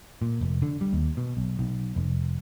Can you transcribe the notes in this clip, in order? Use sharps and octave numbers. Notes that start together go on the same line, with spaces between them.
A#2
F1
D3
G3
D#2
B2
B1
B1
F1